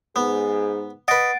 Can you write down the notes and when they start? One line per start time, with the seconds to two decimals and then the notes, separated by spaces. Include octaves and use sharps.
0.16 G#2 B3 G#4
1.08 B4 D#5 F#5 A6 D7